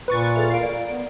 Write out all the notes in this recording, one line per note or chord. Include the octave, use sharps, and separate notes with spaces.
A#2 B4 C#6 A6
G#4 A4 E5 F6 A6
F4 A#4 F5 C7 D7
D5 D7
B3